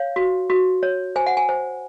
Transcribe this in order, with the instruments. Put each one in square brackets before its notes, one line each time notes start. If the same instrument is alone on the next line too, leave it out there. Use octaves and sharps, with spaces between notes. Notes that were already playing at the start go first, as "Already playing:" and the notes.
Already playing: [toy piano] C#5 F5
F#4
F#4
C#5
C5 G#5
F#5
G#5
C5